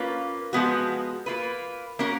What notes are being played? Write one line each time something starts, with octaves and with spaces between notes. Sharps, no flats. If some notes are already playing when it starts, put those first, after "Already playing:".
Already playing: A#3 C#4 F4 B4
F3 G#3 B3 F#4
A#3 F4 B4
A#3 C#4 F#4 A#4